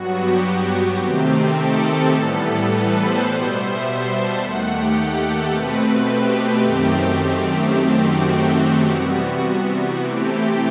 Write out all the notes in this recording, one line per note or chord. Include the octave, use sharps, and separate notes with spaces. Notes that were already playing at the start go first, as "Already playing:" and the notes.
Already playing: G2 F#3 B3 F#4
G4
C3 D#3 A3 C4
A4
A2 E3 G3 B3
B4
C5
B2 G3 B3 C5
E5
C6
A5
D#2 D#3 A3 F#5
G4
G4
A4
B2 A3 C4 B4
B4
G4
F#2 D#3 A3 C4 G4
F#2 D#3 A3 C4 G4
F#4
F#4
G4
C3 E3 G3 B3 F#4
C3 E3 A3 C4 G4
G4